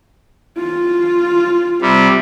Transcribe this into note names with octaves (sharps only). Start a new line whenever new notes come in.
F4
C3 G3